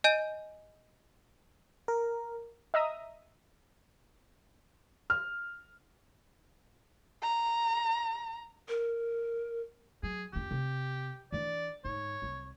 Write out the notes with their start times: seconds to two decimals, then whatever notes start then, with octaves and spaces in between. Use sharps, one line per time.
0.04 D#5 G#5 G6 D#7
1.88 A#4
2.74 D#5 E5 A#5 D#6
5.10 F6
7.22 A#5
8.68 A#4
10.03 F#3 G#4
10.33 F2 C#4 G4
10.51 C3
11.32 E3 D4 D5
11.85 G#2 D3 C#5
12.22 C2 F#3